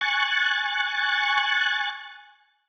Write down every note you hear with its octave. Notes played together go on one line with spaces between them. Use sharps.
G#5 C#6 F#6 A6